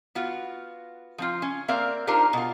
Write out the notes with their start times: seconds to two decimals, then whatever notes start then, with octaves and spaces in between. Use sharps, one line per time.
0.15 B3 F4 F#4
1.18 F3 C4 F4
1.42 C#4
1.68 A#3 C4 A#4 D5 E5 F5
2.07 D4 D#4 F4 G4 A#4 C5
2.33 B2 F4